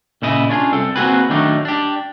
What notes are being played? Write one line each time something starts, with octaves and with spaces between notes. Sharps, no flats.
A#2 C#3 E4 D#5
C#4 D4 F4 G#4
C2 A4 G5
A#3 C4 C#4 F#4 G#4 B4
D#3 F#3 A3 D4 D#4
D4 G4